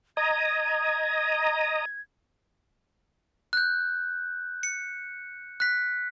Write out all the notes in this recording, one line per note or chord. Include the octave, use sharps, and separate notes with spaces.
D#5 A#5 D#6 G#6
F#6 G6
C#7
F#6 B6